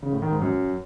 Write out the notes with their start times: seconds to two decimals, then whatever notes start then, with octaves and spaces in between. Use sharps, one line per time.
0.03 C#3
0.12 A2
0.22 D#3
0.32 G#2
0.41 F#2